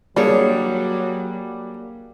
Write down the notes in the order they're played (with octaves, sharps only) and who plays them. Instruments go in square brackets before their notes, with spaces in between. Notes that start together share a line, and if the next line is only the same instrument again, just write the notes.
[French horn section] F#3 [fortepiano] G3 D4 [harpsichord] A#3 [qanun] G4 G#4 C#5